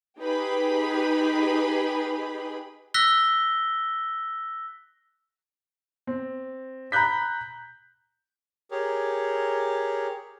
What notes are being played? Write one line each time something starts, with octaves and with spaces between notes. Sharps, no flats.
D#4 G4 G#4 B4 G5 B5
E6 F#6 A#6 B6 G7
C4
A#5 B5 F#6 G6 B6
G4 G#4 A#4 C#5